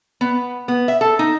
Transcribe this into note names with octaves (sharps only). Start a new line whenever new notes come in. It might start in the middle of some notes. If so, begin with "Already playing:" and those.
B3
B3
E5
A4
D#4